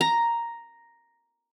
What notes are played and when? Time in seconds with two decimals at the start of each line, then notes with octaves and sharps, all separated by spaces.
0.01 A#5